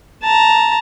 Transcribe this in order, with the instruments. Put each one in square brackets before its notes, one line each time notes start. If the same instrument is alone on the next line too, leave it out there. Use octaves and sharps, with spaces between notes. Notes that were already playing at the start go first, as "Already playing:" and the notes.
[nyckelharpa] A5 A#5